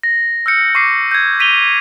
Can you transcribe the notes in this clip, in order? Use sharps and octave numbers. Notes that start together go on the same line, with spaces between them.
A#6
E6 F6 G6 C#7
C#6 D6 C7
G6 G#6
B6 D#7 F7 G7